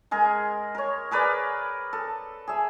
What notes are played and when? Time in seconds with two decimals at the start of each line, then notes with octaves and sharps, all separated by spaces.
0.11 G#3 G#4 A#4
0.75 A#4 C#5
1.11 G#4 A#4 B4 D5
1.93 A4
2.47 G#4 E5